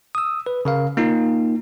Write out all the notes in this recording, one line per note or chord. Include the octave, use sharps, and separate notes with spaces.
D#6 E6
B4
C#3 A#4 F5
A#3 D#4 F4